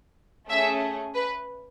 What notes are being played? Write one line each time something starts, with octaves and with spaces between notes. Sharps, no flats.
A3 C#4 G#4 E5
B4